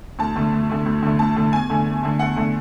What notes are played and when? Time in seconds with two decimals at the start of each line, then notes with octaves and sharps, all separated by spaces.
0.19 D2 A5
0.36 D3 A3
0.53 D2
0.69 D3 A3
0.86 D2
1.03 D3 A3
1.19 D2 A5
1.36 D3 A3
1.53 E2 G#5
1.69 D3 A3
1.86 E2
2.03 D3 A3
2.19 E2 F#5
2.36 D3 A3